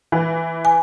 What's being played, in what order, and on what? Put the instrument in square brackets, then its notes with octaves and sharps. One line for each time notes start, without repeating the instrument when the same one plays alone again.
[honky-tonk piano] E3
[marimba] G#5